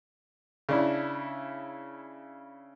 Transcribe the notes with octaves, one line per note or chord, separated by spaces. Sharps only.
C#3 D4 E4